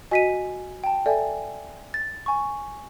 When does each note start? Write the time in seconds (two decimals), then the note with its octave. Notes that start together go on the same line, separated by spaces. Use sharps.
0.11 F#4 D#5 G#5 B6 D#7
0.84 G5 A5
1.06 A4 D5 E5 G#5
1.94 A6
2.26 G#5 C#6